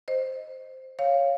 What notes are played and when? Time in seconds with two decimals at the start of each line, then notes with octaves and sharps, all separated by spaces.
0.08 C5 D#5
0.99 C#5 F5